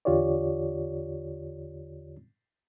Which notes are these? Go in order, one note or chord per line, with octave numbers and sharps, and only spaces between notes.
E2 D3 F4 G4 C#5 D5